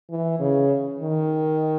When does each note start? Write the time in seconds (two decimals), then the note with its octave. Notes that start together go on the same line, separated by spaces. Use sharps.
0.11 E3
0.40 C#3
0.99 D#3